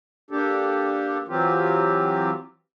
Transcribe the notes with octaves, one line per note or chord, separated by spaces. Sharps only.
A#3 D4 G4 A4
E3 F#3 C4 F4 G4